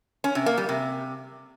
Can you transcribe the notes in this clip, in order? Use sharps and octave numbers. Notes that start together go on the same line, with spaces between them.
C#4
C3
A#3
G3
C3